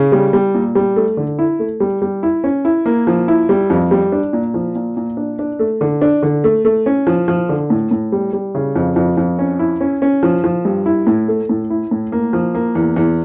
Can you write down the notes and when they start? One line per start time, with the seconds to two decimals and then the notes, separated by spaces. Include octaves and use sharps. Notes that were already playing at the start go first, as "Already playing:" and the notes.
Already playing: C#3
0.12 G3
0.33 G3
0.54 A#2
0.75 G3
0.96 A3
1.17 D3
1.39 E4
1.59 A3
1.80 G3
2.02 G3
2.23 E4
2.44 C#4
2.65 E4
2.86 A#3
3.07 F3
3.28 E4
3.49 G3
3.70 F2
3.91 G3
4.12 D4
4.33 A#2
4.54 F3
4.75 A#2
4.97 A#2
5.17 D4
5.39 D4
5.59 A3
5.81 D3
6.02 D4
6.23 D3
6.44 A3
6.65 A3
6.86 C#4
7.07 F3
7.28 F3
7.49 D3
7.70 A2
7.91 A2
8.12 G3
8.33 G3
8.55 C#3
8.76 F2
8.96 F2
9.17 F2
9.39 C#4
9.59 E4
9.81 C#4
10.02 C#4
10.23 F3
10.44 F3
10.65 G2
10.86 E4
11.07 A2
11.28 A3
11.49 A2
11.70 E4
11.91 A2
12.12 A#3
12.33 F3
12.55 A#3
12.75 E2
12.96 E2